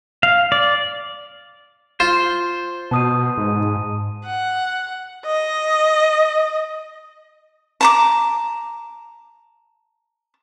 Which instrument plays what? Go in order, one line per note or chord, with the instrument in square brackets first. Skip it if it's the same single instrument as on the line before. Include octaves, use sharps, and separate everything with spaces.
[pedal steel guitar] F5
D5
[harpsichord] F4 [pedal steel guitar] C5
[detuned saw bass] B2 [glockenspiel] A5 D#6 D#7
[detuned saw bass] G#2
[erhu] F#5
D#5
[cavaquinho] A5 A#5 D6